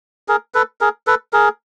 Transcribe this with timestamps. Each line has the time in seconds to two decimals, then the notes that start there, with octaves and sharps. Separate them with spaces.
0.28 G#4 A#4
0.54 A4 B4
0.81 G#4 A#4
1.07 A4 B4
1.33 G#4 A#4